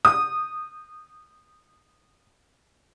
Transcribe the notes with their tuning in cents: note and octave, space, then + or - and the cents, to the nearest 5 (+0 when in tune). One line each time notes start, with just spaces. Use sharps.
D#6 -15